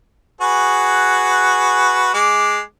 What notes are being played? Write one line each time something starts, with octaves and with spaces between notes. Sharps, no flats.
F#4 G#4 B4
G#3 D6